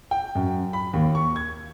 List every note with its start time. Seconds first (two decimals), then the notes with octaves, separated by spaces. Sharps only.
0.11 G5
0.35 F#2
0.73 B5
0.93 D#2
1.15 C#6
1.36 G#6